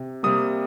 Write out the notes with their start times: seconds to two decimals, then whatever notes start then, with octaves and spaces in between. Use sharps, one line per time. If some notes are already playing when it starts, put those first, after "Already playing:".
Already playing: C3
0.23 C3 G3 A#3 D#6